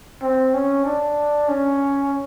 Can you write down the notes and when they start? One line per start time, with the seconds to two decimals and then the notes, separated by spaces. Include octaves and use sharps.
0.22 C4
0.54 C#4
0.85 D4
1.48 C#4